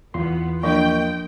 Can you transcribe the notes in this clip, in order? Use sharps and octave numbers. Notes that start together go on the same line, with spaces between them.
E2 B3 F4 C6
F3 A#3 D4 D#5 G5